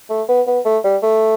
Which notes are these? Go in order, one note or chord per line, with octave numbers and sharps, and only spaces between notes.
A3
B3
B3
A3
G3
A3